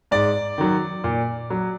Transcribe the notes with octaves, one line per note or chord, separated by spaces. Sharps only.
G#2 D5
D#3 F#3
A#2
F#3